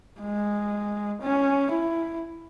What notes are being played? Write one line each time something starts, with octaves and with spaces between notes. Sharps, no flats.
G#3
C#4
E4